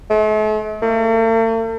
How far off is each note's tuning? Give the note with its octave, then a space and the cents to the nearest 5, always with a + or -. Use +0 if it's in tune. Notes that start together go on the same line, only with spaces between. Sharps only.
A3 -45
A3 +45